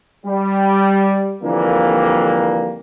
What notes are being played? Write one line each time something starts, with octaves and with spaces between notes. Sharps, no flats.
G3
F2 D3 E3 F3 G3 A#3